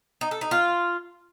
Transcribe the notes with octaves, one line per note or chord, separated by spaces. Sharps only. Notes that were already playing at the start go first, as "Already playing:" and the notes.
D#4
A4
D#4
F4